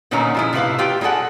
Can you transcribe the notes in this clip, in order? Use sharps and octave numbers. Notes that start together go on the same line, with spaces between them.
A#2 D3 D#3 B3 C#4 A#5
F3 G#3 E4
A2 C3 D#3 E4 B4 F5
F4 G4 G5
G3 G#3 G#4 A4 F#5